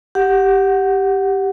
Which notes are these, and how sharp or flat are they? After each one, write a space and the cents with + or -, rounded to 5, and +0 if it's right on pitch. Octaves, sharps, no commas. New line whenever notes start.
G4 +0 F#5 +0